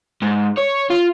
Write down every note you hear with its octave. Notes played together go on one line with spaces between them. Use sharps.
G#2
C#5
F4